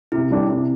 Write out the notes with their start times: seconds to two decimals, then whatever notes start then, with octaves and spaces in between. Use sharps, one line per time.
0.12 C3 E4
0.31 G3 D4 G4
0.49 C3